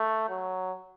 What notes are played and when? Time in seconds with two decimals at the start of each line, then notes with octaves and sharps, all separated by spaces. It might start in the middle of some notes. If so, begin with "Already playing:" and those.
Already playing: A3
0.29 F#3